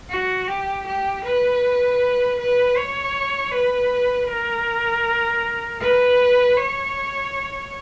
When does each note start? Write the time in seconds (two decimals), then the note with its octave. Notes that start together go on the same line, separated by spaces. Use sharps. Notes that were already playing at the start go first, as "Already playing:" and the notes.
0.10 F#4
0.48 G4
0.87 G4
1.24 B4
2.39 B4
2.77 C#5
3.52 B4
4.28 A#4
5.81 B4
6.57 C#5